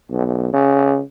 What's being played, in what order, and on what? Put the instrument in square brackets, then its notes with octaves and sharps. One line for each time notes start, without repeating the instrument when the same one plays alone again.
[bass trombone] B1
C#3